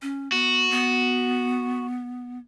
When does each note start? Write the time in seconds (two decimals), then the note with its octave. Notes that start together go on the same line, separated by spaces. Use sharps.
0.02 C#4
0.32 B3 F#4
0.71 B3